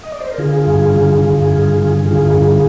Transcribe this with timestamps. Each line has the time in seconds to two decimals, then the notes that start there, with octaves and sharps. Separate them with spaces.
0.03 D#5
0.12 D5
0.20 C5
0.30 A#4
0.38 D3 F4 G#4
0.67 G2
0.95 D3
1.22 D3
1.51 G2
1.78 D3
2.05 D3 F4 G#4
2.34 G2